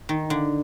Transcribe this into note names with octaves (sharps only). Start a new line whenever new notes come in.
D#3
D3